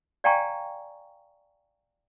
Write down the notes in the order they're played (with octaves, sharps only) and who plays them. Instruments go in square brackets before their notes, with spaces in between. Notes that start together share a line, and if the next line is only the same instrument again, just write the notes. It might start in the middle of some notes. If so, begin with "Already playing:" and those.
[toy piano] D5 F5 G5 G#5 A#5 C#6